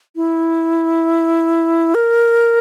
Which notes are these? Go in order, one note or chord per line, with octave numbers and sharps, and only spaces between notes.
E4
A#4